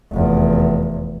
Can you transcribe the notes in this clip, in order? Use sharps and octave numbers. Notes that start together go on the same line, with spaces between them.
F1 E2